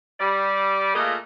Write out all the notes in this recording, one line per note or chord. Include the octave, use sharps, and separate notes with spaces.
G3 D5
A#2 A3 A#3 F4 G#4 D#5